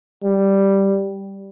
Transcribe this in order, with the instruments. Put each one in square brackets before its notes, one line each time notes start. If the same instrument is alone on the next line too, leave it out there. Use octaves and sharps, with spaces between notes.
[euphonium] G3